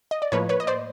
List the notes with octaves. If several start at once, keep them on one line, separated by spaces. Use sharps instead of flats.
D#5
D5
A2 F3 A#3 B4 C#5
B4 C#5
D#5
C5 D5